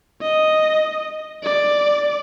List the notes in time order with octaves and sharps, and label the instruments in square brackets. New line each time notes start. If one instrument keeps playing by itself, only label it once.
[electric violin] D#5
D5